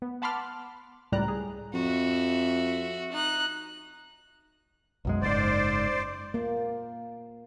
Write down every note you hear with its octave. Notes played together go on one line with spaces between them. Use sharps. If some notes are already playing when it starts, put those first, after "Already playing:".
B3
F#5 A5 B5 C6 D6 F6
C#2 A2 G3 D5 A#5 F#6
G#4
F2 F#4 E5
D#4 F#6
B1 F#2 G#3
F#1 G#2 C5 D5
A#3